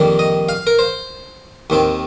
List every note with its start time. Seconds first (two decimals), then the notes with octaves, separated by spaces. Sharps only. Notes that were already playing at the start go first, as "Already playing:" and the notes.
Already playing: F2 D#3 G3 A#3
0.19 D#5
0.49 F5
0.67 A#4
0.79 C5
1.70 D#2 D#3 C4